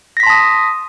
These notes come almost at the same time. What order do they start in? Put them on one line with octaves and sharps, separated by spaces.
A#6 B6 C6 A5 D#6